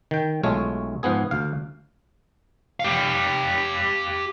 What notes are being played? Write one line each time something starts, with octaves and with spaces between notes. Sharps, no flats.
D#3 G5
B1 G#3 A3 F4 C#5
G#2 F3 B3 G#4
D2 F5
G4 F5